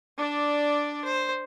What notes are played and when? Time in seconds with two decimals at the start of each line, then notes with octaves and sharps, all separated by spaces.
0.18 D4 D5
1.05 C5